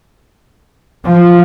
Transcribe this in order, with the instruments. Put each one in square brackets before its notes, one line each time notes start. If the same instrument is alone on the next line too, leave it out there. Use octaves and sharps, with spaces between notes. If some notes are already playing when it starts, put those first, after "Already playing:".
[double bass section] F3